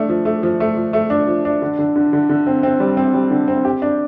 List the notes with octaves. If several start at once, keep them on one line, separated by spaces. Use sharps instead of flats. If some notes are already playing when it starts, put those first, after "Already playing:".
Already playing: A3 D4
F3
A3
F3
A3
F3
A3
D4
F3
D4
D3
D3
D3
D3
D3
C4
C4
G3
C4
G3
D3
C4
G4
D4